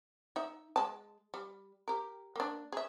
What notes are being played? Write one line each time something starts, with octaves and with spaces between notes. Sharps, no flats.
D#4 E5
G#3 A5
G3
G4 A#4
A#3 D4
G#4 E5